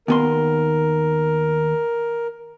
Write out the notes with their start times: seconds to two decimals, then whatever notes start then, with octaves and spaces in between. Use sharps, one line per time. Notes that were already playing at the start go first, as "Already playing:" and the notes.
0.08 D#2 B3 A#4 C6